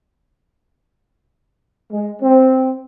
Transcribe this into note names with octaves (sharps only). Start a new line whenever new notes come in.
G#3
C4